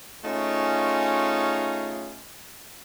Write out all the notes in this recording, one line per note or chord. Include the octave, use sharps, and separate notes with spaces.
A3 C#4 D#4 F4 G#4